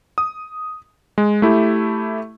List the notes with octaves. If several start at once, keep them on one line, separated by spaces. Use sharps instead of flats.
D#6
G#3
A3 E4 G4